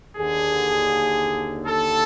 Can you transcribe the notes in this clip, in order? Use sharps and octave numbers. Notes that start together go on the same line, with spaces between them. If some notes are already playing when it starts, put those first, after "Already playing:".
D#2 D3 G#4
A4